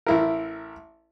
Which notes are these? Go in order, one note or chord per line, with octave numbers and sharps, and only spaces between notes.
A1 E4 A#4